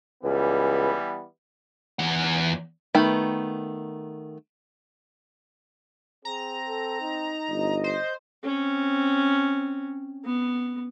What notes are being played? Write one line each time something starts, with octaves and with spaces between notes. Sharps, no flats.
C#2 E3 G3 B3
E2 F#5
D#3 A3 B3 G5 B5
C4 G#4 A#5
A4
D#4
G1 D#5
C5
C4 C#4
B3